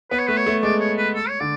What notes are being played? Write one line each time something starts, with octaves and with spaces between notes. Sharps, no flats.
B3 B4
C#5
A3 B4
C#5
A3
G#3 D5
C#5
B4
A4
C#5
D3 D5